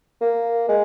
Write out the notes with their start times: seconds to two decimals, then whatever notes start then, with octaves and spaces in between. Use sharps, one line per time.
0.21 A#3
0.68 G#3